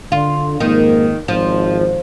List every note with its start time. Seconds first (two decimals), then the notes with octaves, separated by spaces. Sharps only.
0.12 D3 F4
0.60 F2 G#2 D#3 A#3
1.28 G#1 F3